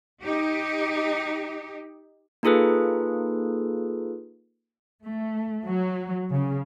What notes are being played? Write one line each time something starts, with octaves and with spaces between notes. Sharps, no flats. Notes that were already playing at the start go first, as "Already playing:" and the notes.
D#4 G4
A#3 D#4 F4 G#4 A4 B4
A3
F#3
C#3